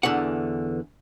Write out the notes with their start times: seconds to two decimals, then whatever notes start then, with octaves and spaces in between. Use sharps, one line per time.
0.03 E2 D3 E3 F#5